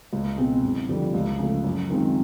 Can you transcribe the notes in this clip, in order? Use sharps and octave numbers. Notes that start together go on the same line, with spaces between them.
C#2
B2 G#3 C4
F#1
F2 D3 G3
C#2
C#3 F3 A3
F#2
D#3 G#3 C4 F4